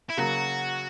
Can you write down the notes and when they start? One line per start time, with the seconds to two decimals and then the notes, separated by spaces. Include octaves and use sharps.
0.10 E4
0.17 C#3 F#3 A#3 F#4